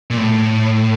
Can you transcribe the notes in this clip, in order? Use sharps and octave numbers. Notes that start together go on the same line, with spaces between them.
A#2
A2